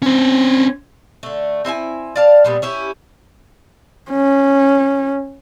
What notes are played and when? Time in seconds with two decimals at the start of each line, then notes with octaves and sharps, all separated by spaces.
0.03 C4 C#4 C5
1.23 D3 A3
1.65 C4 E4 E5 G#5
2.16 D5 F5 A5
2.45 A#2 G3 B3
2.62 C#4 E4 G4
4.11 C#4